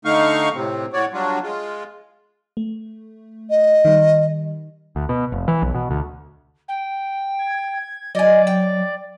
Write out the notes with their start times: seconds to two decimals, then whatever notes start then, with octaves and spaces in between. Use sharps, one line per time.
0.05 D3 A3 D#4 F5 C#6 F6
0.55 A2 C3 C4
0.93 A2 F#4 C#5 D5
1.13 F#3 G3 D4 F4 F#4
1.43 G#3 F4
2.57 A3
3.50 D#5
3.85 D#3 G3
4.96 D2
5.09 B2
5.32 F1
5.48 E3
5.62 B1
5.74 B2
5.91 D2
6.68 G5
7.39 G#6
8.15 F#3 D5 D#5 G#5
8.47 G5